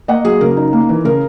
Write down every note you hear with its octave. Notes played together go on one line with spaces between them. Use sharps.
A#3 D#5 F#5
F#3 G#4
C#3 A#4
D#4
A#3
E3
C#3 A#4